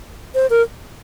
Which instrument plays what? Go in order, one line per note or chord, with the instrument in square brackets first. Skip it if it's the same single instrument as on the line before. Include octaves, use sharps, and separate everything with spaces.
[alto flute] C5
A#4